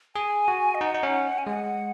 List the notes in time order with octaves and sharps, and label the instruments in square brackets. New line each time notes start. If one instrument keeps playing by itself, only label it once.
[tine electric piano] G#4 [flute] G#5
[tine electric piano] F#4
[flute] D#5
[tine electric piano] D#4 [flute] F#5
[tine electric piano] D#4
C#4
[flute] G#5
[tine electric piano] G#3 [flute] F#5